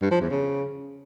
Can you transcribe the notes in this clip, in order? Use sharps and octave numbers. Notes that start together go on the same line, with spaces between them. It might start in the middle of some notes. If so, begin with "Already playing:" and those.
G2
F3
E2
C#3